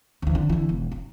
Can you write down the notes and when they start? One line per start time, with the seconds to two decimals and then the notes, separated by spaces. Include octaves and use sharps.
0.22 D2 E3
0.35 D3
0.49 D3 E3
0.69 E1
0.92 D#4